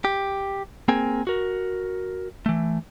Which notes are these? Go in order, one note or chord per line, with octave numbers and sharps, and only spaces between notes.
G4
A#3 C4 G#4 A#4 G5 G#5
F#4 A#4
E3 A3